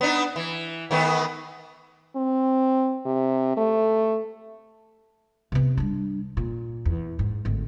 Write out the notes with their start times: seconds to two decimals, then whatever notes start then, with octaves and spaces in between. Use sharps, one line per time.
0.01 B3 D4 D#4
0.36 E3
0.91 D#3 A3 B3
2.16 C4
3.06 C3
3.57 A3
5.52 C3 B3
5.77 G3 D4
6.37 A#2
6.85 E2
7.19 G#2
7.45 G#1 D2